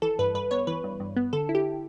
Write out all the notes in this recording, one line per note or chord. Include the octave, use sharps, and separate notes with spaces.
E3 A4
G2 B4
G2 B4
B3 C#5
E3 B4
G2
G2
B3
D3 A4
E4
G4